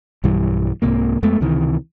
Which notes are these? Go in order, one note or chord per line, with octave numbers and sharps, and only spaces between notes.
B1 G2 E3 G3
C2 G#2 C3 A#3
F2 G#3 A3 B3
C#2 C3 D#3 E3